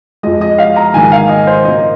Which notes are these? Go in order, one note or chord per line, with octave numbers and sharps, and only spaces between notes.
F2 F3 G#3 D#5
D#5
F5
A#5
G#2 D#3 A#3 G#5
F5
D#5
C5
A#2 A#3 D#5